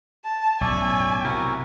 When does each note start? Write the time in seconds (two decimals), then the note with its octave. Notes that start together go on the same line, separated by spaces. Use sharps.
0.24 A5
0.61 B1 F#2 A2 C#5 D5 E5 G#5
1.24 C3 E4 F#4 A#4